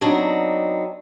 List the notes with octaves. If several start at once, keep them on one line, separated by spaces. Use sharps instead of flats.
F#3 B3 C4 D4 D#4